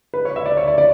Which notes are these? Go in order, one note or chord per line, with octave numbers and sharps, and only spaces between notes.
B4
C#5
E5
D5
C#5
D5
D5